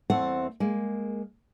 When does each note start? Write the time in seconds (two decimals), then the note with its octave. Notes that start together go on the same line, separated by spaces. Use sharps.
0.10 E2 A3 C4 C5 F#5
0.60 G#3 A#3